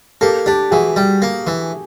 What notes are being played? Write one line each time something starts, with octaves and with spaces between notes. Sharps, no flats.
A#3 G4 A4
D4 G4
E3 F#4 G#4
G3
A#3
E3